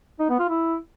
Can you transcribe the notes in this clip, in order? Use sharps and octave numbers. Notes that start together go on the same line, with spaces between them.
D#4
B3
F4
E4